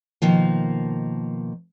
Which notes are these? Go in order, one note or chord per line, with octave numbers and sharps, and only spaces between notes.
B2 D#3 F3 A#3